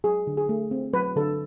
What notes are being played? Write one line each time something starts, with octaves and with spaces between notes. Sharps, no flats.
F#3 G#4
D3
G#4
A3
C4
F#3 B4
D3 A4